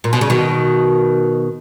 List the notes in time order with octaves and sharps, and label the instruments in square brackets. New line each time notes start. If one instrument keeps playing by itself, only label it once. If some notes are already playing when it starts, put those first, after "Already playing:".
[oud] A#2
B2
C#3
B2 D#3